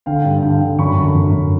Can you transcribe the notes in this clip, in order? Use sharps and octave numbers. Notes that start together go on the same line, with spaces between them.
D3 F5 G5
G2
D3 F5 G5
D3
F#2 B5 C#6
D3
F#2
F#2